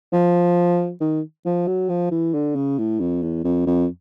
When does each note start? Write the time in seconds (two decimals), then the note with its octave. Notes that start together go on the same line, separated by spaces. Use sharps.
0.13 F3
1.01 D#3
1.45 F3
1.67 F#3
1.89 F3
2.11 E3
2.34 D3
2.55 C#3
2.78 A2
3.00 F2
3.22 E2
3.44 F2
3.66 F2